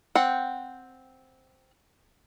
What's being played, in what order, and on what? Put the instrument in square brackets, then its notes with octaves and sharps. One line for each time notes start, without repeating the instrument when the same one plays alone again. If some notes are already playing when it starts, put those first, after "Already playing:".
[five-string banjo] C4 F#5